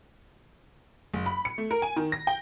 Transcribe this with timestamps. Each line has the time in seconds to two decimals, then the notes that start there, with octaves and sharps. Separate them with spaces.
1.14 F#1
1.26 B5
1.45 C#7
1.58 A3
1.71 A#4
1.82 G#5
1.96 D#3
2.12 A#6
2.27 G5